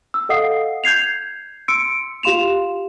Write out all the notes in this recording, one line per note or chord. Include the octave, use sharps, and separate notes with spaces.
E6
A4 D#5 F5 F#5 D#6 C7
G6 G#6 C7 F7
C6 E6 C#7 D7
F4 G4 F5 C6 E7 F7